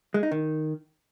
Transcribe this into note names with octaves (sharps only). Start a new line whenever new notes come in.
G#3
D#4
D#3